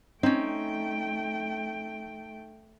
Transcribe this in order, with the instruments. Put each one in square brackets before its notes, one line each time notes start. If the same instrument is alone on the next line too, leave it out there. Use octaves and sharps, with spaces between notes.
[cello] A3 G5 [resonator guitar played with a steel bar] C4 C#4 [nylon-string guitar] D#4